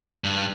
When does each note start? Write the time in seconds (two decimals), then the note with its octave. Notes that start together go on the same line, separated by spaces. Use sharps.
0.24 G2